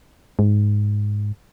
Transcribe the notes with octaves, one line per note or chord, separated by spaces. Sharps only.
G#2